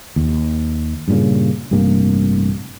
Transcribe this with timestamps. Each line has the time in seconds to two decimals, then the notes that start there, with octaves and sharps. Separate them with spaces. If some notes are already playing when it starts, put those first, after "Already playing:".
0.16 D#2
1.08 G2 A#2 C#3
1.71 A1 G2 C3 A#3